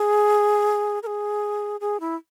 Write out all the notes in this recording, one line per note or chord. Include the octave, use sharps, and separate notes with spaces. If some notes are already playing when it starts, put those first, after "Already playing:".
Already playing: G#4
A#4
G#4
G#4
E4